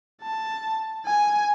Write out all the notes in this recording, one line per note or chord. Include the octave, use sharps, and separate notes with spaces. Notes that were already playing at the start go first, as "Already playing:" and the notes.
A5
G#5